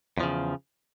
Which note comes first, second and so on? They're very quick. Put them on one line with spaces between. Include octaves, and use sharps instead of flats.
E2 F3 C#3